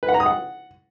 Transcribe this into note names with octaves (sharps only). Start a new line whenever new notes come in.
B4
F#5
A#5
D#6
F#5